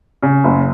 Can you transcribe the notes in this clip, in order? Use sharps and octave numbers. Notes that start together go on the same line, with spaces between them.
C#3
F#1